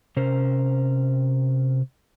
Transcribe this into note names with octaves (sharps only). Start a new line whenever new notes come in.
C3 C#4 A#4 C5